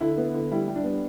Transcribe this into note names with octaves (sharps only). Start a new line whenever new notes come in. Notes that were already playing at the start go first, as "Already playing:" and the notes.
D3 E4
B3
D3
G3 E4
G3
D4
B3